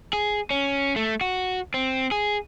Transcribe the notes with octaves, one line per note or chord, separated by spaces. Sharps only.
G#4
C#4
A3
F#4
C4
G#4